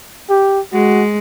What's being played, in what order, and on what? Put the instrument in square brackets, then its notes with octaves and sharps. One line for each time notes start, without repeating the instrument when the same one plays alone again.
[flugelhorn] G4
[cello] G#3 [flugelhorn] F#4